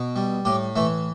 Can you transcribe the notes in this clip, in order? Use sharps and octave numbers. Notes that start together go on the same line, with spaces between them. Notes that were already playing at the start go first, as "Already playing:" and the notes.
Already playing: B2
G3
A2 G4
E3 A3